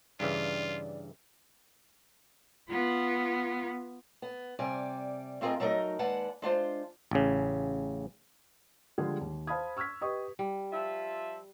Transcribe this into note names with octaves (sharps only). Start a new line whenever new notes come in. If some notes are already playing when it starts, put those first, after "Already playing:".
G2 C#3 E3 F4 D5
B3 F4
B3
C3 G3 D5 G#5
A3 C4 F4 G#4 A#4 D#5
F#3 A3 D#4 A#4 D#5
D#2 G#3 B4 D5 F#5 A5
G#3 D4 F4 C5
A1 C#3
D3 F3 G3 G#3 G4 G#4
D#2
C5 F5 A5 B5 D#6 G#6
C#6 E6 F6 G#6 B6
G4 B4 D#5 C#6 D#6
G3
F3 F4 E5